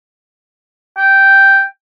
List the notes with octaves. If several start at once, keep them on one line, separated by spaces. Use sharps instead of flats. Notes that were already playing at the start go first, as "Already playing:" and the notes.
G5